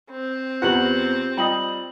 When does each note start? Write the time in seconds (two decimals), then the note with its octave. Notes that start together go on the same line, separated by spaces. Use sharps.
0.10 C4
0.62 E2 F4 G4 B4 F#5 F#7
1.37 G3 F4 D#5 G5 F#7